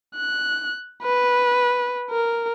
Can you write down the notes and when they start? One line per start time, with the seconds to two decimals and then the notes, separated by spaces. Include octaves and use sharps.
0.16 F#6
1.03 B4
2.11 A#4